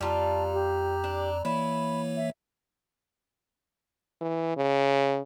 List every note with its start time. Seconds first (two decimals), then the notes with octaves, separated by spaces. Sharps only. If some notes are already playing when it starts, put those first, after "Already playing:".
0.01 F2 G3 F4 A5 A#5
0.53 G4
1.04 D4
1.45 E3 A#3 E4 C#5 B5
2.16 E5
4.21 E3
4.57 C#3